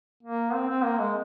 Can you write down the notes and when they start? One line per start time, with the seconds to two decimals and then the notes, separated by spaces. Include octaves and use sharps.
0.23 A#3
0.53 C4
0.69 C4
0.84 A#3
0.99 G#3